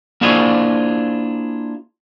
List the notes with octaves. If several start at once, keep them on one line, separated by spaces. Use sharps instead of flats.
A#3 D4 E4 F4 G#4 C5